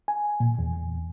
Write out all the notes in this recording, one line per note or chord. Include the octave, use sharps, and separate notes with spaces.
G#5
A#2
E2
E2